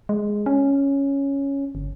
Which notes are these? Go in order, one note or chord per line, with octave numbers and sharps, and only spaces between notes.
G#3
C#4
G1